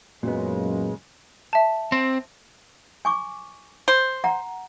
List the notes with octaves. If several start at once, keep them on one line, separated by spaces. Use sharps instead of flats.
F#2 A#2 C#3 F#3 G#3 B3
E5 A5
C4
G#5 C#6 D6
C5
F#5 A#5